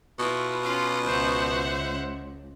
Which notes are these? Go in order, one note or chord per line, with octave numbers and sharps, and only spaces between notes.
B2 E4 F4
C#4 F4 F5
C#2 C5 E5 F#5